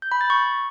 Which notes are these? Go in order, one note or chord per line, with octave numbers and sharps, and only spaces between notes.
G6
B5
A6
C#6